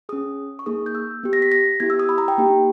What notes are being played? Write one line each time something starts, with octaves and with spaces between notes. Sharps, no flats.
C#4 G#4 D#6
C#6
A#3 D#4 G#4 D#6
G6
E6
B3 G4
A#6
B6
A#6
B3 E4 G4 G#6
E6
D#6
B5
A#5
G5
A#3 D#4 G4